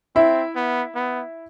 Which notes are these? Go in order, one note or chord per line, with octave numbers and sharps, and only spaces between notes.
C4 E4 E5
B3
B3